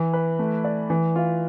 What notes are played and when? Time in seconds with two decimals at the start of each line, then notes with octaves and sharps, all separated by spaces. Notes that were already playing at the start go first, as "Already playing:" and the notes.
Already playing: E3
0.13 B4
0.39 A3
0.64 D5
0.90 E3
1.16 F4